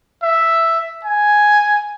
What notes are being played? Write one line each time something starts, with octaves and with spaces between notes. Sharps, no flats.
E5
G#5